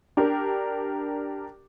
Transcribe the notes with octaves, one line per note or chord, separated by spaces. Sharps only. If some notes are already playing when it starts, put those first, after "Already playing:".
D4 G4 A#4